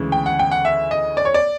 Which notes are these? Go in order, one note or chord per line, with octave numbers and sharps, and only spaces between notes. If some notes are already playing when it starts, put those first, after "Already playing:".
Already playing: D2 C#3 E3 G#3
G5
F#5
G5
F#5
E5
D#5
D5
C#5
D5